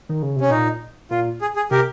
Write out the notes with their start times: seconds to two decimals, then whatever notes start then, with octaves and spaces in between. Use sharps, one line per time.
0.09 D#3
0.23 C#3
0.36 C3
0.41 C#4
0.49 A#2 D#4
1.11 A#2 F4
1.41 G#4
1.56 G#4
1.71 C3 G4 A#4